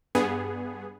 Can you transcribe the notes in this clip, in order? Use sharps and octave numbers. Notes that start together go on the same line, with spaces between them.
G2 B3 G#4